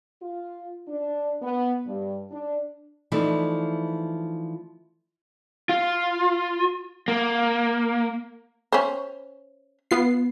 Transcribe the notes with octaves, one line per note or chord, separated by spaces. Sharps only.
F4
D4
B3
G2
D4
E3 F3 A3 D4 D#4
F4
A#3
C#4 C5
B3 F4 C7